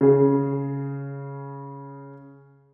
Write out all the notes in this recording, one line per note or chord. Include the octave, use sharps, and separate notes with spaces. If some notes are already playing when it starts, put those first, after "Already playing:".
C#3 G#4